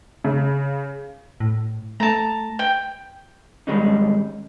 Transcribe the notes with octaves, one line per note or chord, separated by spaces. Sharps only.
C#3
A2
A3 A5 A#5
G5
G#2 D#3 G3 G#3 C#4 D#4